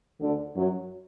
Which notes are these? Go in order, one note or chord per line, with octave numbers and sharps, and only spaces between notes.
D2 D3
F#2 F#3